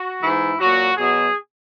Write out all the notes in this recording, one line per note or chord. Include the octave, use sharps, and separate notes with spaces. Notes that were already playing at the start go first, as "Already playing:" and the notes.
Already playing: F#4
G#2 E3 E4
A#2 F#3 F#4
B2 F#3 G#4